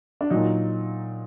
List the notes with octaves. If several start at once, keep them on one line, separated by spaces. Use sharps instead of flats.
D4
A#2 F#3 D#4